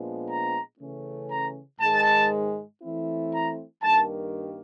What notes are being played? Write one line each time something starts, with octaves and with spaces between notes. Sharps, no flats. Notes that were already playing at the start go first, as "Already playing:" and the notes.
Already playing: A#2 F3 G#3 B3 D4
A#5
C#3 E3 A3 C#4
A#5
G#2 D#3 G#3 A5
E3 A3 C4 E4
A#5
G2 D#3 G3 A#3 A5